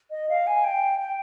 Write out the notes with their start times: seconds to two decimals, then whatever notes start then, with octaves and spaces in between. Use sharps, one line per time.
0.11 D#5
0.29 F5
0.47 G#5
0.64 G5
1.00 G5